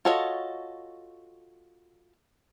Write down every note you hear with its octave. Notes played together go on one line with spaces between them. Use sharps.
F4 F#4 A4 C#5 D#5